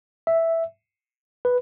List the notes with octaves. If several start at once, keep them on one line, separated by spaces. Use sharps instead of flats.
E5
B4